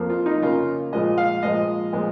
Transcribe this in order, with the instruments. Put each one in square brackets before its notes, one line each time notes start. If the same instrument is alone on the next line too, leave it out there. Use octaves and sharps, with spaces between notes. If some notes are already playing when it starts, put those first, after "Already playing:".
Already playing: [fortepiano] F2 F3 A#3
F4
D#4
C#3 A#3 F4
A#2 F3 G#3 D#5
F5
A#2 F3 G#3 D#5
A#2 F3 G#3